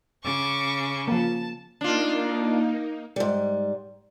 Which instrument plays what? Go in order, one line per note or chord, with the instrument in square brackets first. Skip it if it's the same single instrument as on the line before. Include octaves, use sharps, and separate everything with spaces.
[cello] C#3 [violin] C#6 D6
[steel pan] F3 A#3 [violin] A5
[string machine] A#3 D#4 [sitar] D4 F4
[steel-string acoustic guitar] G#2 G3